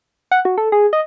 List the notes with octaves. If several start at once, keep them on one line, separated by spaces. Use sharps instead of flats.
F#5
F#4
A4
G#4
D#5